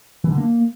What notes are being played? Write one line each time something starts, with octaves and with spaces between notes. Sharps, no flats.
E3
D3
A#3